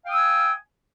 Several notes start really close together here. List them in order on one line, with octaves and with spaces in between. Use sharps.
F5 G5 D#6 E6 G#5